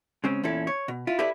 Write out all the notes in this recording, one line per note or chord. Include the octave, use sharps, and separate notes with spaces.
C#3 G#3 C4 C#4
E2 A#2 C#4 E4 A4
C#5
B2
E4 F4
E4 G4 A4 B4 D5 E5